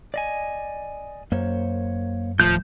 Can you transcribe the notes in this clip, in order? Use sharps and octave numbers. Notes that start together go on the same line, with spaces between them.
D5 D#5 G#5
F#2 A#3 C5 C#5
D1 D#2 A2 F3 G6